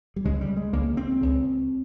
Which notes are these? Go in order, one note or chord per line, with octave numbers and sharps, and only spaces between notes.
G3
C#2 C#3 G#3
G3
G#3
C#2 C#3 A#3
C4
C#2 C#3